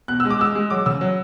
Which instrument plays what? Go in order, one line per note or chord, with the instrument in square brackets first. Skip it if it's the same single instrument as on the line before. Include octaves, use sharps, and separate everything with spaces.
[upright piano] B2 F#6
G#3 E6
D6
G#3 E6
G#3
F#3 D6
C#3 E6
F#3